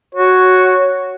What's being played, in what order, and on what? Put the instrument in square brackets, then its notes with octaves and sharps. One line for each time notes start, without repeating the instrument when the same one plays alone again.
[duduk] F#4 [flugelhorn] C#5